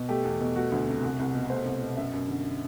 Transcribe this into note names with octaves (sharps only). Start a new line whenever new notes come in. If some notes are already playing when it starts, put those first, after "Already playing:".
Already playing: B2
A3 G4
E2
B2
A3 F#4
D2
C3
C2
C2
B2
A3 C5
C2
B2
F#2 E5
F#2
D3